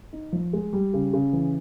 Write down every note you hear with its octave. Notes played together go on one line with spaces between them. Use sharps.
D#4
F3
G#3
G3
C#3
C#3
E3